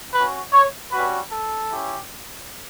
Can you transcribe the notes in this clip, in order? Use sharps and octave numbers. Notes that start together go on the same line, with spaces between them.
C#4 F#4 B4
C#5
G3 C#4 F#4 B4
A4
C#4 E4 G4